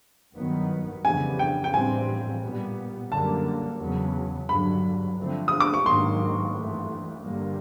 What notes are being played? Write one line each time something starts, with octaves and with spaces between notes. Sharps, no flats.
G2 D#3 F#3 B3
F2 C#3 E3 G3 B3 G#5
G5
G5
A2 E3 G3 C4 G#5
A#2 G3 B3
F#2 D3 G3 A#3 A5
E2 C#3 F#3 B3
G2 D3 F#3 B5
D3 F3 A3 C4
D#6
D6
C#6
G#2 D#3 F#3 A#3 C6
G2 E3 A3
G2 D3 G3 A#3